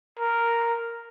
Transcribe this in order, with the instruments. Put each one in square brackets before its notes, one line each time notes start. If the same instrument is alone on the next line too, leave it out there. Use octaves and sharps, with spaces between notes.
[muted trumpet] A#4